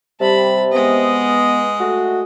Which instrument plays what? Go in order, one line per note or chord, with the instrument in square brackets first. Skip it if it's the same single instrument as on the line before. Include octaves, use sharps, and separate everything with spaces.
[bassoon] C3 [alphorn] G3 [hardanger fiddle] A5 B5
[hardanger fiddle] G#3 D#5 [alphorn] B3
[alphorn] A3 [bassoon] F#4